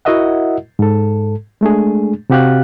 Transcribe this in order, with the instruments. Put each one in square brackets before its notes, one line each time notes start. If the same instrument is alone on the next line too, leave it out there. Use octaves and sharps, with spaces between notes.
[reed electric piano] E4 F#4 A#4 D#5 E5 F#5
G#2 A4
G#3 A3 D4 G#4
C3 C4 F#4 G4 F5 F#6